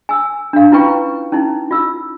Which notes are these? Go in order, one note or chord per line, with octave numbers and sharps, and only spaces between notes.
G#5 E6
D4 F5
C#4 E4 F4 B4 G5 C#6
C#4 D#4 E4
F4 E6